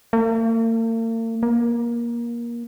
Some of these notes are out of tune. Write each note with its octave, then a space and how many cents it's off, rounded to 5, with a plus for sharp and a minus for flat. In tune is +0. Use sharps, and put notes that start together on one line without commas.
A#3 -45
A#3 +20